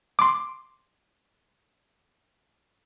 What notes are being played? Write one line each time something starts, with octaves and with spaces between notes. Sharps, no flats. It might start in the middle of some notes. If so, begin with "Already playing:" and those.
C6 D6